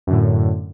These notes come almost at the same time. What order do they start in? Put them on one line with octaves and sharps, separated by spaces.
F#2 D3 A2